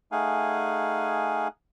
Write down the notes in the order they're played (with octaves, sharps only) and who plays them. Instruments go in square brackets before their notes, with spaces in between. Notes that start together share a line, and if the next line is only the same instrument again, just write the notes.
[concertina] A3 D#4 G#4 F5 F#5 G#5